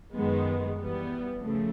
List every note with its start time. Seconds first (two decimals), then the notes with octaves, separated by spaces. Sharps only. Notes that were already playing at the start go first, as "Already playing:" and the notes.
0.13 F#2 D#3 G#3 B3
0.77 E3 G3 B3
1.40 C#3 F3 A3